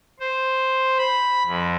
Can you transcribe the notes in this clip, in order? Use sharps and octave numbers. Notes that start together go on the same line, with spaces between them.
C5
B5
F2